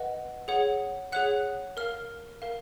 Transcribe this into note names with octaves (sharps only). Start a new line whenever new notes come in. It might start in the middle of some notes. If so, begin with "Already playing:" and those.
Already playing: B4 D#5 F#5
G#4 C#5 F#5
G#4 C#5 F#5 F#6
A#4 F5 F6
A#4 F5